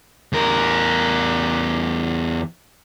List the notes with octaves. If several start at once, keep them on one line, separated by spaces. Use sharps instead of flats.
E2 A#4